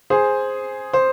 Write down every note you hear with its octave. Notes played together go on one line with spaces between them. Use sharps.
G#4 C5
C5